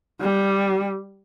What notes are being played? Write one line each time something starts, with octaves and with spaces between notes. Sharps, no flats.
G3